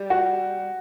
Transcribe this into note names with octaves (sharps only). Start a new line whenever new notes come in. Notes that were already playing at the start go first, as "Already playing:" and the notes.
Already playing: G3
F#4